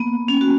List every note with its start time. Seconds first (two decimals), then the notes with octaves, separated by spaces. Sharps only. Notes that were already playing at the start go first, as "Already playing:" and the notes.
Already playing: A#3 B3
0.28 C#4
0.41 F#4